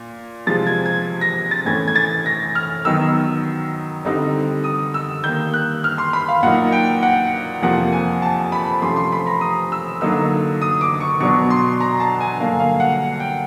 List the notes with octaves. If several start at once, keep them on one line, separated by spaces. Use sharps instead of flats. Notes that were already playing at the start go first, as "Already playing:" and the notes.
Already playing: A#2
C3 F3 G#3 A6
G#6
G#6
A#6
A6
A2 E3 A3 C#4 G#6
G#6
A6
A#6
F6
D#3 F#3 B3 D#4 E6
D3 G3 C4 D#4
D#6
E6
D#3 G3 A#3 G6
F#6
F6
C6
B5
F5
A#2 F#3 A#3 D#4 F#5
G5
F#5
F2 C3 F3 A#3 F#5
G#5
A5
B5
C3 F3 A3 C#4 C6
C6
B5
A#5
D#6
E6
D3 F#3 A#3 D#4 E6
D#6
D6
C#6
B2 F#3 B3 D4 C#6
C6
A#5
A5
G#5
G2 D3 F#3 A#3 D4 F5
F5
F#5
G5